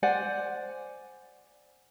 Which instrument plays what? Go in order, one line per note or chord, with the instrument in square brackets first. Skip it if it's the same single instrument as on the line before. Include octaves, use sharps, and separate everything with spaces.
[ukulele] C5 D5 F#5 G#5